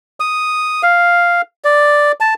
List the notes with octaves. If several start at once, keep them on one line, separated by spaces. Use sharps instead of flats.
D#6
F5
D5
A5